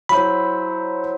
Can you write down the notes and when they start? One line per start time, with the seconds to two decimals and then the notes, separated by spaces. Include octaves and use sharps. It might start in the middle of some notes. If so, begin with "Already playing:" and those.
0.09 F#3 E4 C5 B5